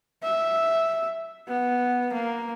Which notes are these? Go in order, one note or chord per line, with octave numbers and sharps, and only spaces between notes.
E5
B3
A#3